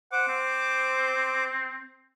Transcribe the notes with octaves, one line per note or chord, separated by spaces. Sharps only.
C5 F#5 D6
C4